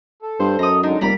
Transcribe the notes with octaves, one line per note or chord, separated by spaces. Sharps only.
A4
G2 C5
F#2 A4 D#5 A#5 D#6
D3 F#3 G#3 D4 D#4
F1 G3 A#3 D5 A#5 B5